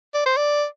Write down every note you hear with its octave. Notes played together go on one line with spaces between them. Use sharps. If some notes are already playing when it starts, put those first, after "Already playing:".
D5
C5
D5